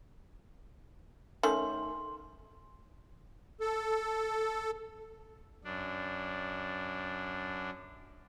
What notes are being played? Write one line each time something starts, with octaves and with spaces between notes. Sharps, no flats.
D#3 A3 C#4 C6
A4
F#2 D4